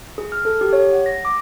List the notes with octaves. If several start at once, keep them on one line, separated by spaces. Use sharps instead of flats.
G#4
F6
A4
G4
C#5
F#5
A#6
D6